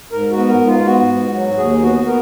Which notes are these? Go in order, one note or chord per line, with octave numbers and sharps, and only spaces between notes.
G#2 A#4
F#4
B3
A#4
G#2
F4
B3 F#4
G#2
F#3
D#2 G#4
B3 F#4
B3 A#4